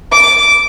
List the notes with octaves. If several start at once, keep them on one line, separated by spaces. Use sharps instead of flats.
D6